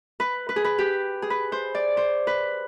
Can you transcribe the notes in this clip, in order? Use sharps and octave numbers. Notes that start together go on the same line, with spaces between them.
B4
B4
G#4
B4
G4
G#4
B4
C5
D5
C5
B4